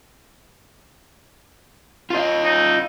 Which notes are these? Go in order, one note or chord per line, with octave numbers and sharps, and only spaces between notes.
F4 D#5
D#4